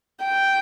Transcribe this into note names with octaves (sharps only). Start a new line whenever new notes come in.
G5